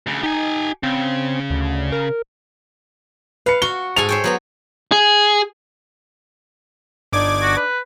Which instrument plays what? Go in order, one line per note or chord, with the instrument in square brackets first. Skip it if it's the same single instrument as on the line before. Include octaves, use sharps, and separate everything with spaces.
[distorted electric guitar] D2 C#3
[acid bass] D#4 [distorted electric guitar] G4 G#5
[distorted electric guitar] C#3 [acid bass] C4
[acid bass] D2
A#4
[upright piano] B4 C#7 [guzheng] F5
[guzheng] F#4 [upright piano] G7
[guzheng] G#2 A4 G#5 [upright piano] F7
[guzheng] C5 C#5 G5
F#3 B3 A#5
[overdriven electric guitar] G#4
[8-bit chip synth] G1 D6 G#6 [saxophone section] D4 D#4 D5
[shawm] F#4
B4